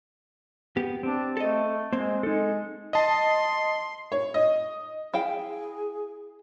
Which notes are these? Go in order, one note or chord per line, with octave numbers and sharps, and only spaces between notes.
B3 G4
C4 D4
A3 A4 D#5
G#3 A#3 C4 C5
G#3 D#4 A4
D#5 A5 C6
C#5
D#5
E4 G#4 F5 G5